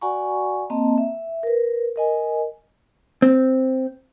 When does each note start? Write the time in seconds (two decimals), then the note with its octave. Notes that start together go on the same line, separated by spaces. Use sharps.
0.02 F#4 D5 F#5 G#5 A#5 C#6
0.70 A#3 C4 D#5 A5 A#5
0.98 E5
1.43 A#4 B4
1.96 A#4 D#5 G#5
3.22 C4